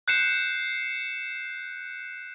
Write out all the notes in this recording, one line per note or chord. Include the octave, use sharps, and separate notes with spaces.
F#6 G6 C7 C#7 E7